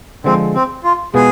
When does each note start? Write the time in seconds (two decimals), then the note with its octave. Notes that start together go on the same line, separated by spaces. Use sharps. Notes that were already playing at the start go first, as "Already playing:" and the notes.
0.24 D3 F3 G#3 C4
0.54 C4
0.84 F4
1.14 B2 G#3 B3 F4 G#4 B4